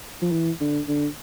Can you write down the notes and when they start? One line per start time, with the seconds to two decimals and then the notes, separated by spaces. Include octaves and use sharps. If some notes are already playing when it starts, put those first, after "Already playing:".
0.22 F3
0.32 E3
0.61 D3
0.88 D3